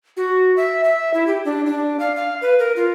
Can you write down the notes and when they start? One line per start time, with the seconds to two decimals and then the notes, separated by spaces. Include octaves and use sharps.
0.17 F#4
0.57 E5
0.84 E5
1.14 E4
1.27 G4
1.45 D4
1.66 D4
2.00 F5
2.15 F5
2.42 B4
2.59 A#4
2.76 F4